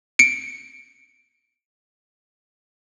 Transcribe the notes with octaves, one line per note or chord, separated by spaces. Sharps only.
C#7 D7